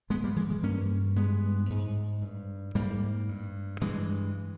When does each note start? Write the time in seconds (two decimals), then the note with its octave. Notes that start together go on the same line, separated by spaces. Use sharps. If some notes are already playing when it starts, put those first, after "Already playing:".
0.10 G#2 G#3 B3
0.24 G3 A#3
0.36 E3 G#3
0.50 E3 G#3
0.63 G2 A#3 C#4
1.16 G2 G#3 B3
1.70 G#2
2.22 G2
2.75 G#2 G3 A#3
3.29 G2
3.81 G2 E3 G#3